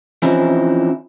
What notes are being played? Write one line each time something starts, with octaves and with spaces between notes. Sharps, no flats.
E3 F3 C4 C#4 D#4 E4